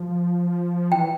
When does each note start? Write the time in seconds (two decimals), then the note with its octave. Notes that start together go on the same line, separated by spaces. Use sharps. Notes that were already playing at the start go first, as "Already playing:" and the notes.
Already playing: F3
0.92 E3 G5